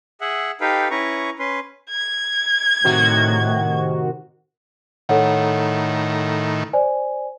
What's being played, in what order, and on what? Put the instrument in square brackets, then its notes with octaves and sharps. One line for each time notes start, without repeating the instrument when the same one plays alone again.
[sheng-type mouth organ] G#4 E5 F#5
D#4 G4 A4 B4 F5 G5
C#4 E4 B4 A#5 C#6
C#4 B4 C6
[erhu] G#6
[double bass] A2 [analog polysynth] C3 D#3 F#4
[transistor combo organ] A2 D#3 [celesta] A4 C#5 F#5
[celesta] C5 D5 G#5